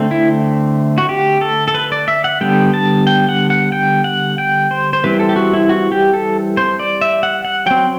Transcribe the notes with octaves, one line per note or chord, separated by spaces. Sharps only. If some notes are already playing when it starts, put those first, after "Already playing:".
Already playing: D3 A3 C4
E4
F#4
G4
A4
A4
B4
D5
E5
F#5
D3 G3 B3 G5
A5
G5
F#5
F#5
G5
F#5
G5
C5
C5
E3 G3 C4 B4
A4
G4
F#4
E4
F#4
G4
A4
C5
D5
E5
F#5
F#5
F#3 C4 G5